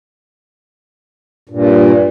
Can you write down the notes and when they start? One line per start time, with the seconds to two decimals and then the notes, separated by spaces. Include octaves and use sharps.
1.49 G2 A#2